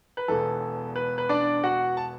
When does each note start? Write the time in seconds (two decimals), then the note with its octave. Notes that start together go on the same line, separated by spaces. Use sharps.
0.17 B4
0.28 E1 E2 E3 A4
0.96 B4
1.18 B4
1.29 D4 D5
1.63 F#4 F#5
1.97 A5